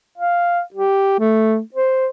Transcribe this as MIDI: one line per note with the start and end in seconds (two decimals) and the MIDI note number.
0.18 0.61 77
0.74 1.18 67
1.19 1.60 57
1.75 2.08 72